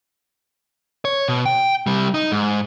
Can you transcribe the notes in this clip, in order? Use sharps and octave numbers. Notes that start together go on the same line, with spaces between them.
C#5
B2
G5
C3 G3
D#4
G#2